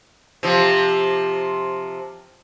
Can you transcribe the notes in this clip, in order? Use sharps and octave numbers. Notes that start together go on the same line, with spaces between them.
C3 F3